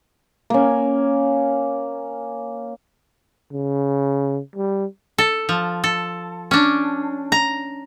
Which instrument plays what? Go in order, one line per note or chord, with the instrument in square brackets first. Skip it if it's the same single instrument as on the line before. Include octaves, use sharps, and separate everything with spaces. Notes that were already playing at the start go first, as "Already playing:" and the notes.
[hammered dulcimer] A#3 C#4
[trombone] C#3
G3
[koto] A4
F3
A4
C#4 D4
A#5